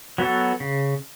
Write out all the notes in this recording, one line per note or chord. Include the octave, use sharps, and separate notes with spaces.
F#3 B3 F#4 A4
C#3